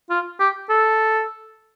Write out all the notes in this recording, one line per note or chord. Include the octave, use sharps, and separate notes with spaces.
F4
G4
A4